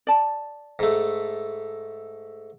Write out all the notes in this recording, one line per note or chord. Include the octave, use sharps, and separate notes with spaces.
D5 A5
G#2 A3